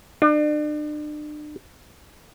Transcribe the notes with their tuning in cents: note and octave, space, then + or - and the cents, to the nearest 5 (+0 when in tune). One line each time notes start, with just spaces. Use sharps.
D4 +35